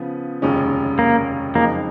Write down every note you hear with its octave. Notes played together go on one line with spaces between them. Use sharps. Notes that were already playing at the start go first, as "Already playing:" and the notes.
Already playing: C#3 F3 B3
F1 D#2 C#3 G#3 C#4
A#3
F#1 F2 F3 G#3 A#3 D#4